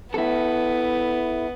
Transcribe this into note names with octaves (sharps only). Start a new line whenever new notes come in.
B3 E4 A4